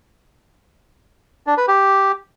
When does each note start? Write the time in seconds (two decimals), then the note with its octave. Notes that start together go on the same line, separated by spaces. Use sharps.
1.47 D4
1.57 B4
1.68 G4